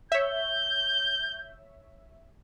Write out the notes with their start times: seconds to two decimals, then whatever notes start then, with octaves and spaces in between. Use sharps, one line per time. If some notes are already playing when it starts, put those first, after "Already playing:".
0.12 C#5 E5 G6